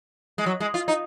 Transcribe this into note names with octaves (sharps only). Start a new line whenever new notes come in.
G#3
F#3
G#3
F4
D#4